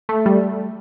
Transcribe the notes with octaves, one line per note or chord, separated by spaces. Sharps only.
A3
G3